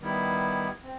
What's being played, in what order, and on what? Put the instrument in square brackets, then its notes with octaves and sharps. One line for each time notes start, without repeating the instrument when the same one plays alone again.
[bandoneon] D#3 G3 B3 E4
C4